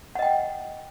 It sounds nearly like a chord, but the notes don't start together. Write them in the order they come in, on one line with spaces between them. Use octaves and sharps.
F#5 D#5 G5